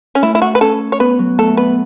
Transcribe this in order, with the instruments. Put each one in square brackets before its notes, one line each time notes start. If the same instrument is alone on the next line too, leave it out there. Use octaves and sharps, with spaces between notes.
[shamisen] C#4
[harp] A3 [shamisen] E4
[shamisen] E4
F#4
B4
[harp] C#4 [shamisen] A4
[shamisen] C#5
[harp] B3 [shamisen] B4
[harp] F#3
[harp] A3 [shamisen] A4
[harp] B3 [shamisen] B4